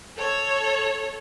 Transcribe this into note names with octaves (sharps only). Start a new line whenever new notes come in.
A4 C#5